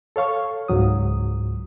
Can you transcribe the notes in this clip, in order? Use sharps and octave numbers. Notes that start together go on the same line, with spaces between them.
A4 C#5 F5 C#6
C#2 G#2 F#3 D#6